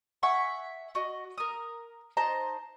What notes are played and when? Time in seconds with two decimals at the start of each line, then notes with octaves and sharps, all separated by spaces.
0.23 E5 F#5 G#5 C#6
0.95 F#4 D#5
1.38 A#4 D#6
2.17 D#4 C5 A5 A#5